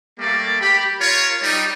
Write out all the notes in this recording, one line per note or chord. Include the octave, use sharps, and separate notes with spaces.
G3 A3 A#3 D5
G4 B5
F4 A#4 C#5
G3 D#4